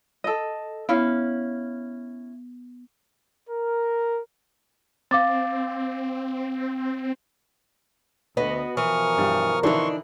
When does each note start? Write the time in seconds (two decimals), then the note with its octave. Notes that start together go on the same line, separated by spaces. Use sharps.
0.24 A4 D#5
0.89 B3 C#4 E4 F5
3.50 A#4
5.11 C4 F5 D6 A6
8.37 D2 B3 F#4 D#5
8.77 B2 E3 F3 A#4 C#6 D#6 F6
9.18 G2
9.63 D3 E3 D4 D#4 C6 C#6